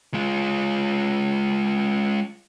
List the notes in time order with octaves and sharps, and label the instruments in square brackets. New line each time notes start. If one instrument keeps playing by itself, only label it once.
[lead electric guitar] G#3 F4